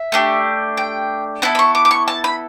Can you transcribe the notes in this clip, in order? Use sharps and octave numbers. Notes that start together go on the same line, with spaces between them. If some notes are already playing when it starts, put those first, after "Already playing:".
Already playing: E5
A3 D4 G4
G5
B3 E4 A4 A5
B5
C#6
D6
D6
C#6
A5
B5